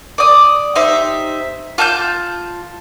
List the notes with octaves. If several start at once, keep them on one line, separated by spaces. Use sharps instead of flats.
D5 D#6
D#4 G4 C5 E5
F4 A5 F6 G6